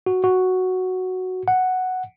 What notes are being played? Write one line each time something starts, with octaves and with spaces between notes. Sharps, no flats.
F#4
F#4
F#5